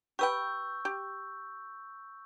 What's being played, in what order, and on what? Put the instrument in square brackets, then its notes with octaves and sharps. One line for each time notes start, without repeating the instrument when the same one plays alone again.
[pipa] G4 B4 G5 [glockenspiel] C#6 E6 G6
[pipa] G4